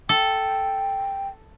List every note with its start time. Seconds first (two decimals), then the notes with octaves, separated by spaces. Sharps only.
0.09 A4 G5